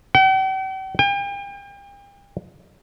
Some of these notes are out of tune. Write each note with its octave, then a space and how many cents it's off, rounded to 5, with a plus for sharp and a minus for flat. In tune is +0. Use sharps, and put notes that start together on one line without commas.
G5 -45
G5 +40